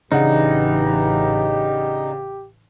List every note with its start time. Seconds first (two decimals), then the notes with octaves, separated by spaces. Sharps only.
0.12 A1 C#3 E3 D4 D#4 G4 F#5